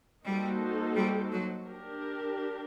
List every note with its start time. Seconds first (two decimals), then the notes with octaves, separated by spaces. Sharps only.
0.24 G3 A#3 D#4 F#4 A4 C5
0.95 G3
1.32 F#3
1.67 D4 G4 A#4